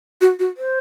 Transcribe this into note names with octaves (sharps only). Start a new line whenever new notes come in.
F#4
F#4
C5